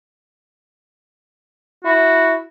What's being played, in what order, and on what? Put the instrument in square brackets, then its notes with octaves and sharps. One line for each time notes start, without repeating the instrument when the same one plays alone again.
[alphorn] E4 [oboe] F#4